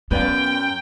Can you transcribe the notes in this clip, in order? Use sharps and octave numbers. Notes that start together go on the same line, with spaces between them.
F#2 B3 B4 D5 F5 G5